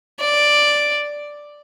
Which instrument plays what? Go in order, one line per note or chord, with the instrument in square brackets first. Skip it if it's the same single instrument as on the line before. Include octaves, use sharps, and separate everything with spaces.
[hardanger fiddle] D5